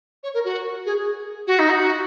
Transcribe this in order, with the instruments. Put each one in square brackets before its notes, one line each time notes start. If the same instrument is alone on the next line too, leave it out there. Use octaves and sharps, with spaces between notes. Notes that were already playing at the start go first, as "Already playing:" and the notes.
[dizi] C#5
A#4
F#4
G#4
F#4
D#4
F#4